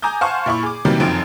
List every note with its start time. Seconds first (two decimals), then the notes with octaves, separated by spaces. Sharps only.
0.02 G#5 A#5 D6 D#6 G6
0.21 C5 F5 F#5 G#5 A5 C#6
0.46 A#2 E4 B5 C#6
0.63 G#4 D6
0.85 C3 D#3 E3 F#3 G3 A#3
1.00 F1 F#2 D#3 F3 C4 D7